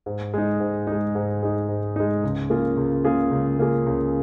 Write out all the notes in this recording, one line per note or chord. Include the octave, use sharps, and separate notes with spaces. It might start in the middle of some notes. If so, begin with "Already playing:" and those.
G#2
G#3 D#4
G#2
D#4
G#3
G#2
G#3 D#4
G#2
G#3 D#4
C#2
C#3 A#3 F4 G#4
C#2
C#3 A#3 F4 G#4
C#2
C#3 A#3 F4 G#4
C#2